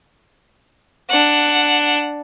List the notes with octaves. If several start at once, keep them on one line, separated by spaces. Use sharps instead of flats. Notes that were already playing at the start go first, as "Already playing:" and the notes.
D4 F#5